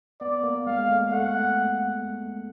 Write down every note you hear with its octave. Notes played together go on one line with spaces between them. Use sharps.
B3 D5
A#3
G#3 F5
A3
A3 F#5